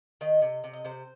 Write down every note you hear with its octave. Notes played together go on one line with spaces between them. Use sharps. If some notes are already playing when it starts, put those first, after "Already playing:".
D#3 D#5
C3
C3
D#5
C3 C5